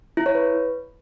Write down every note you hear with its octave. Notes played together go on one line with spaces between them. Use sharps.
E4
C#5
B4